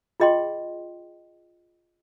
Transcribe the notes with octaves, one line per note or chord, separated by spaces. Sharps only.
F4 G#4 D#5 G5 C6